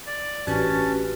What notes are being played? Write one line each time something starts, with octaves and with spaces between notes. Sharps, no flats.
D5
A1 C#4 D4 F#4 G4 B4 A5